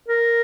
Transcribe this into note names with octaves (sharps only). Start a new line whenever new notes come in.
A#4